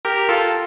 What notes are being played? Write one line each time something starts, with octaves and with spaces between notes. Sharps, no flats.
G4 A#4
F4 A4